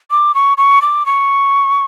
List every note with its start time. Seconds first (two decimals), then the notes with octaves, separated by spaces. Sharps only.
0.11 D6
0.35 C#6
0.58 C#6
0.82 D6
1.06 C#6